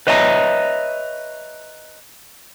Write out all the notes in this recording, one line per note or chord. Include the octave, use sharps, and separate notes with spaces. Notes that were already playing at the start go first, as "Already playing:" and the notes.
B4 C#5 D#5 E5 G#5 A#5